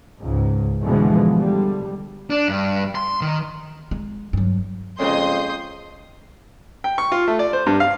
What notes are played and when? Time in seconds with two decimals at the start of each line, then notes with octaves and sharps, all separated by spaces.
0.21 C#2 G#2
0.83 B2 D3 E3 F3 G#3 B3
1.33 D3 G3
2.30 D4
2.48 G2
2.95 C6
3.21 D#3
3.91 G#3
4.33 G2 F#3
5.00 F2 C#3 G#3 A#3 C#4 C6 D#6 G6
6.84 G5
6.98 C#6
7.12 F4
7.28 A3
7.39 D5
7.53 C5
7.66 G2
7.80 F5